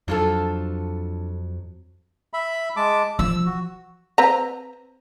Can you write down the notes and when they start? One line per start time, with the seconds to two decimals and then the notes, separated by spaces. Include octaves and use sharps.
0.08 F2 F#3 D4 F4 A4
2.33 E5 B5
2.77 G#3 A5 D6
3.19 F3 E6
3.46 F#4
4.18 C4 B4 A#5